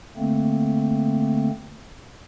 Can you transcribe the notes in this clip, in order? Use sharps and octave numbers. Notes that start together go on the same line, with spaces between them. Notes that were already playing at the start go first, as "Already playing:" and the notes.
D3 A3 A#3 C4